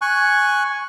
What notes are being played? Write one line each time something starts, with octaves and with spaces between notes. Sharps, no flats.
G#5 C#6 F#6